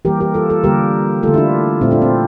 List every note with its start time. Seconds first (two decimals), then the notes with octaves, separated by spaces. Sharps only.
0.05 E3 G3 A#3 G4 A#4
0.21 G4 A#4
0.34 F4 A4
0.50 F4 A4
0.64 D3 G3 A#3 G4 A#4
1.23 D3 A3 F4 A4
1.34 E4
1.37 D4 F4
1.81 A#2 A3 C4 E4
1.91 D4 F4
2.02 C4